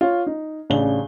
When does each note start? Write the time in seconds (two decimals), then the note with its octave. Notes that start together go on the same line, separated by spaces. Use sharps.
0.01 F4 C#5
0.27 D#4
0.70 A1 C#3 D4 G7